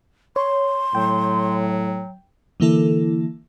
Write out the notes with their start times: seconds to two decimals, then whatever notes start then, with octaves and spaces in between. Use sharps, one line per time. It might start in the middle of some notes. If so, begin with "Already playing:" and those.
0.36 C#5 C6
0.95 A2 F#3 G5
2.60 D3 E3 A#3 E4 A4